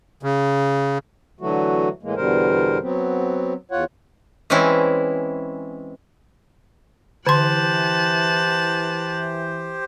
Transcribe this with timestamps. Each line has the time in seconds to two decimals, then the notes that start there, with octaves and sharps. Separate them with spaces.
0.23 C#3
1.41 D3 E3 F#3 A3 F#4
2.03 A2 E3 G#3 A#3
2.16 E2 B2 D3 G3 A#4 C5
2.82 F#3 B3 C4
3.71 E2 F4 C#5 F#5
4.50 E3 G#3 C4 C#4 E4
7.27 D3 E3 G4 C5 A5 C6 F#6